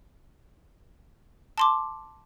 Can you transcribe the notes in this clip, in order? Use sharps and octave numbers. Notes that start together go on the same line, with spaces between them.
A5 C6 D6